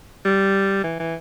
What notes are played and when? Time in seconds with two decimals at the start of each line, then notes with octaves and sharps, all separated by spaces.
0.25 G3
0.84 E3
0.99 E3